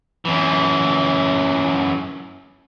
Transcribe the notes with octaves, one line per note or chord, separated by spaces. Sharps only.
F#2 E3